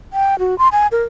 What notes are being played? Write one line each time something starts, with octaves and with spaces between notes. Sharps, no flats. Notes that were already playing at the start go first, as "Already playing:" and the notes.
G5
F#4
C6
G#5
A#4